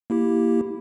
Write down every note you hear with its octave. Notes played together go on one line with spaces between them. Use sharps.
A#3 E4 G4